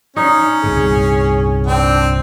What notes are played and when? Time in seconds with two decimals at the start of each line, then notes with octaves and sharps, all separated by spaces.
0.16 C#4 D#4
0.64 C2 G2 A#2 G#4
1.67 C4 D4